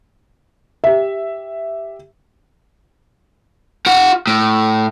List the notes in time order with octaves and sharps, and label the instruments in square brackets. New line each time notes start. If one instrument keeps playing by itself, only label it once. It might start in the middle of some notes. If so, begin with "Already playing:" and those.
[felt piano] G4 E5
[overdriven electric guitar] F4 F#5
A2